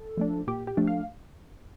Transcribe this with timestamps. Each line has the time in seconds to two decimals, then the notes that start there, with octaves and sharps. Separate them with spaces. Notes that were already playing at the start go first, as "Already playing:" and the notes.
Already playing: A4
0.17 F3 A3 D4
0.47 A#2 G4
0.67 G4
0.77 F3 A3 D4
0.87 F5